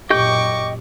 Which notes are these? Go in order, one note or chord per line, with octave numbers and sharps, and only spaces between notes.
F#2 A#2 G4 D#5 G5 C#6 D6 G6